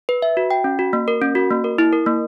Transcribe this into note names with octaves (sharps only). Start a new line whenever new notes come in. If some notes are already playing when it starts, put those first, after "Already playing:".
B4
E5
F#4
G5
C#4
F#4
A#3
A#4
C#4
F#4
A#3
A#4
E4
A#4
A#3